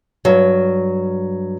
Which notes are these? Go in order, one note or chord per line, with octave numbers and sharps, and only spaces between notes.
G2 F#3